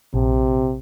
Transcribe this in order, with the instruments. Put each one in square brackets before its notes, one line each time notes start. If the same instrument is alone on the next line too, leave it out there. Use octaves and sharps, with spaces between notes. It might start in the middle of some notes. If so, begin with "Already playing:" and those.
[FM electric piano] A#1 [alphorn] C3